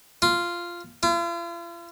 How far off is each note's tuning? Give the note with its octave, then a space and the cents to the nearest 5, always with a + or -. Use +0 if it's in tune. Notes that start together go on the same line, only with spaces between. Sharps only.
F4 -10
F4 -45